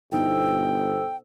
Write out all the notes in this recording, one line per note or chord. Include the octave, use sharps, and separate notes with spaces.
G1 B2 D#4 E4 A4 C5 G5 E6